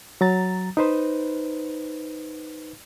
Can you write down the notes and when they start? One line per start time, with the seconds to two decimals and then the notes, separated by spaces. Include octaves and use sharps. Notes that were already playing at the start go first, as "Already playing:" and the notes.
0.21 F#3 A#5 A6
0.77 D#4 B4 C5